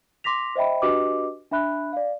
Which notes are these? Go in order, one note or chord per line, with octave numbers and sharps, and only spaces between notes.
C6 D6 A#6 B6 F7
C5 D#5 E5 G5 B5
D4 F#4 G4 B4 D#5 D6
D4 E5 B5 F#6
D5 F5